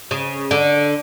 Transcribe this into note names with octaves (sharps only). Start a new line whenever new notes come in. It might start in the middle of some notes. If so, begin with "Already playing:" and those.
C#3
D3